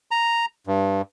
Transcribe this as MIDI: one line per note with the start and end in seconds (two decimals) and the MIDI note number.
0.11 0.46 82
0.67 1.02 43